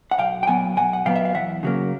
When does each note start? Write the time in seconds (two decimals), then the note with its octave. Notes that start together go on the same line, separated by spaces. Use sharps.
0.11 F#5
0.18 B1 F5 G5
0.43 G5
0.47 A#2 F#3 B3 F#5 G#5
0.76 B1 F#5 G#5
0.93 F#5
1.06 A#2 F#3 B3 F5 G5
1.16 E5
1.25 F5
1.34 E2 E5 F#5
1.63 C#3 F#3 A#3